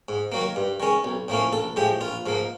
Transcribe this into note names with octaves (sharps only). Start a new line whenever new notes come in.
G#2
D#3 F#3 A#3
G2
D#3 G#3 C#4
B1
A2 F3 A#3 C#4
A#1 A4
A2 F3 G#3 G4
A#1 F4
G#2 F3 A#3